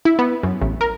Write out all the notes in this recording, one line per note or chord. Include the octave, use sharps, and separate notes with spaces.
E4
B3
F#2
A1
A#4